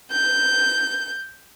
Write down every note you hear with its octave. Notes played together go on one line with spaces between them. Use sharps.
G6